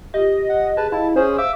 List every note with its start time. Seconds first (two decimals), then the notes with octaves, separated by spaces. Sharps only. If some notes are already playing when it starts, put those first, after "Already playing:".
0.14 F4 G4 D#5
0.49 F#5
0.77 G#4 B4 A5
0.92 E4 D#5 F5 A5
1.16 C#4 G#4 C5
1.38 E5 F5 D6 E6